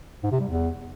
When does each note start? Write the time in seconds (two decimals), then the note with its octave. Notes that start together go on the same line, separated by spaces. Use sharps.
0.23 G#2
0.32 C3
0.40 G3
0.48 E2